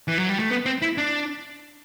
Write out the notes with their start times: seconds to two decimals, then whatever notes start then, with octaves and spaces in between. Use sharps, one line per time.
0.08 E3
0.18 F#3
0.29 G3
0.39 A3
0.50 B3
0.66 C4
0.82 E4
0.98 D4